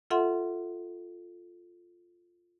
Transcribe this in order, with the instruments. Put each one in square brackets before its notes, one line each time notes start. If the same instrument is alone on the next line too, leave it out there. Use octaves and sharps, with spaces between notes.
[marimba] F4 A4 E5 F#5 C6